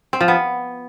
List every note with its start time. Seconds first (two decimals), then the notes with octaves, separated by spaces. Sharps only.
0.13 C4
0.21 F3
0.28 B3